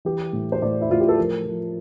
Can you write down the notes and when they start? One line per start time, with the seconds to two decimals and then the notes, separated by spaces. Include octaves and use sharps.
0.05 E3 G4
0.33 A2
0.52 C5
0.62 A2 D5
0.81 E4
0.90 A2 F4
1.00 G4
1.09 A4
1.17 F3 A#4
1.46 F3